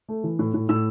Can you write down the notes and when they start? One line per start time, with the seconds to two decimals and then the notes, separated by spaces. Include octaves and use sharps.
0.08 A3
0.24 E3
0.39 A2
0.54 A2
0.69 A2 E6